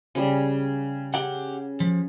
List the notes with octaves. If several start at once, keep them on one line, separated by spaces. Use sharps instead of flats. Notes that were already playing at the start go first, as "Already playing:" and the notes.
C#3 G3
G4 F#5
F3